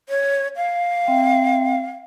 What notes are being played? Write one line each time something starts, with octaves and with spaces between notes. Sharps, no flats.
C#5
F5
C4 E5 G5